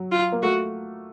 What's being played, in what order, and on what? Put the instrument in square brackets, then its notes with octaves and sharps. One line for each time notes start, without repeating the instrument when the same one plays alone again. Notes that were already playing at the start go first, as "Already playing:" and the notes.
Already playing: [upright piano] F#3
[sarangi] F4
[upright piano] A#3
[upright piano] A3 [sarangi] F#4